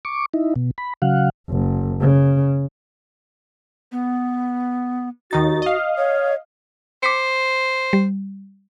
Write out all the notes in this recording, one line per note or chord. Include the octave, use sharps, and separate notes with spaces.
C#6 D6
D#4 E4
B2
B5
C#3 F#3 F5 F#5
F#1
C#3
B3
D#2 D#4 F#4 A6
D#5 F5
C#5
C5 D6 B6 C#7
G3